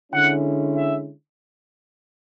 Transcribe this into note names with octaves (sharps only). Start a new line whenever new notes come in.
D3 G#3 C#4 E4 F#5
E5